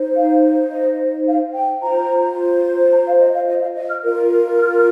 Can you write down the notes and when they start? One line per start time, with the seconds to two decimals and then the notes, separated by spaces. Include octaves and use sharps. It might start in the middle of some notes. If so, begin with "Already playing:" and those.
Already playing: D#4 C5
0.16 F5
0.71 D#5
1.27 F5
1.54 G5
1.82 F4 C5 A#5
2.93 A#5
3.06 F5
3.20 D#5
3.34 F5
3.47 D#5
3.61 F5
3.75 D#5
3.89 F6
4.03 F4 A#4
4.58 F6